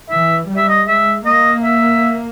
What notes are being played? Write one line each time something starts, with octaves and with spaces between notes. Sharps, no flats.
E3 E5
G3
E5
D#5
G#3 E5
A#3 D#5
E5